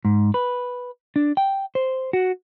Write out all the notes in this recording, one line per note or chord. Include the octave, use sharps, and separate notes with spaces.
G#2
B4
D4
G5
C5
F#4